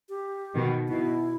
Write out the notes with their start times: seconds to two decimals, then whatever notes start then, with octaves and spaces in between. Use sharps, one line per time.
0.09 G4
0.55 B2 D#3
0.89 B2 E4